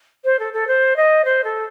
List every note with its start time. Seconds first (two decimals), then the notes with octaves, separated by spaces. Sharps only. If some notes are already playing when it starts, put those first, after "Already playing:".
0.25 C5
0.39 A4
0.53 A4
0.67 C5
0.96 D#5
1.25 C5
1.44 A4